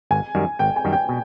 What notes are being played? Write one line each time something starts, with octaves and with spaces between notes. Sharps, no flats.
G#1 G#5
F#2 D#3 G3
G#1 G5
G#5
F#2 D#3 G3
G5
B2